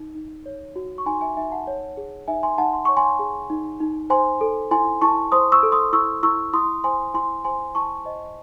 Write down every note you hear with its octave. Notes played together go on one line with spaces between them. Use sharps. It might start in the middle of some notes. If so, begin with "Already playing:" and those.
Already playing: D#4
D#4
C#5
F#4
C#6
D#4 G#5 C6
E5 G#5
D#4 E5 G#5
F#5 A5
C#5
G#4
D#4 E5 G#5
G#5 C6
D#4 F#5 A5
C6
C#5 C#6
G#5 C6
G#4
D#4
D#4
C5 G#5 C6
A4
E4 G#5 C6
E4 A5 C#6
C5 C6 D#6
C#6 E6
A4
C6 D#6
E4 C#6 E6
E4 C#6 E6
E4 C6 D#6
C5 G#5 C6
E4 G#5 C6
C5 G#5 C6
E4 A5 C#6
C5 D#5